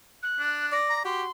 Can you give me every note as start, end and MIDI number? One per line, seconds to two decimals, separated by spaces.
0.22 0.66 90
0.39 0.75 62
0.72 1.01 74
0.72 0.97 94
0.90 1.01 82
1.05 1.27 66
1.05 1.23 67
1.05 1.31 84